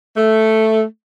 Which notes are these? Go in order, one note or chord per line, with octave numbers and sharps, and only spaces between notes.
A3